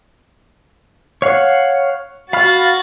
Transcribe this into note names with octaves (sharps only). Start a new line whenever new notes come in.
C#5 F5 F#5
F#4 F5 B5 F6 A6